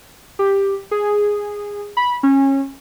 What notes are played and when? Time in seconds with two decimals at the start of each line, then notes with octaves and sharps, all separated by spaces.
0.39 G4
0.91 G#4
1.97 B5
2.23 C#4